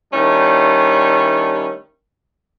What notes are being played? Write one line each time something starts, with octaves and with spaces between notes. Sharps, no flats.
D#3 G3 A3 C#4 D4 E4